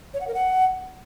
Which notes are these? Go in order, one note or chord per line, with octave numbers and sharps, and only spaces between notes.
C#5
F#5
A#4
F#5